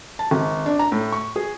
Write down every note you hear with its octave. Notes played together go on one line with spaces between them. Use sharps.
A5
G#1
D4
A#5
A2
C#6
G#4